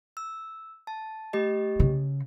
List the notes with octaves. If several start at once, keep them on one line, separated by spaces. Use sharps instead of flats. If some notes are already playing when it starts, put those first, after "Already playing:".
E6
A5
A3 G4 D#5
C#3